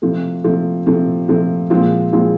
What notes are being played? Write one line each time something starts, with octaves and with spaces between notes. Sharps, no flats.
C3 F3 A3
C3 F3 A3
C3 F3 A3
C3 F3 A3
A#2 F3 G#3 C4 F4
A#2 F3 G#3 C4 F4